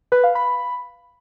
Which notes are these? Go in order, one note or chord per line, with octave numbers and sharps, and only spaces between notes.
B4
F5
B5